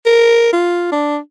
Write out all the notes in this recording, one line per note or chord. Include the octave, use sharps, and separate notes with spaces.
A#4
F4
D4